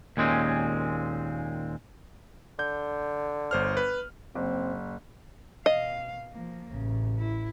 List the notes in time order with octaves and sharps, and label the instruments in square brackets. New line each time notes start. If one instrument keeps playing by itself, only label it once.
[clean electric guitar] D#2 A#2 G#3 C4 C#4
[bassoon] D3 [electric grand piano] G6
[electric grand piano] G1 C5 F6
B4
[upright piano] F#1 [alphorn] C4
[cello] B2 F5 [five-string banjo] D#5
[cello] F3 A#3
[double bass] A1 [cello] C#3
[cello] E4